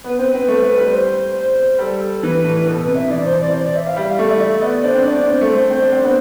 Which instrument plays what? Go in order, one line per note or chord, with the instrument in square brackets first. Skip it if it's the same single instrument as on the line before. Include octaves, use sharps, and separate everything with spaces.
[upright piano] B3 [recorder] B4
[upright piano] C4 [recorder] C5
[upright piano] C4 [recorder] B4
[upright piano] A3
A3
G3
[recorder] C5
[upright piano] G3 [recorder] A4
[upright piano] E3 [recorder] B4
[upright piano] A2
[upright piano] B2 [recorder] A4
[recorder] B4
[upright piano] C3
[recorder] E5
[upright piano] E3 [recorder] D5
[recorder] C5
D5
C5
D5
E5
F5
[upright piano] G3 [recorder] E5
[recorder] F5
[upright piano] A3 [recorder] E5
[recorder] D5
[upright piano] A3 [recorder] E5
[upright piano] B3 [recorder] D5
[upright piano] D4 [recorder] C5
[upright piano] C4
[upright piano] D4 [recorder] D5
[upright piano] C4 [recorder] C5
[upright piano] A3
[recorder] C5
[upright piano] A3
C4
D4
C4
B3